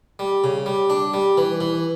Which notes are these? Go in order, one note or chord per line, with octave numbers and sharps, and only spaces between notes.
G3
C#3
G3
D4
G3
E3
E3